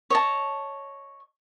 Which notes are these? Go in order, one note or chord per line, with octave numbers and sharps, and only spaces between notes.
C#5 D#5 A5